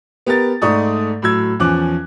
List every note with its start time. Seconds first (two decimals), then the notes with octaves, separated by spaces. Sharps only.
0.26 B3 G4 A#4 A6
0.62 G#2 A3 D5 C#6 D#6
1.22 A2 F#3 E6 G#6
1.60 E2 F3 C#4 D6 F#6